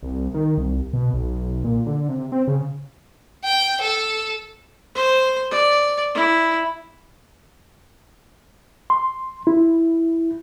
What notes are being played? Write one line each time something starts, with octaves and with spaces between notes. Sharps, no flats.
C2
D#3
C2
B2
B1
A#2
D3
C3
C4
C#3
G5
A4
C5
D5
E4
C6
E4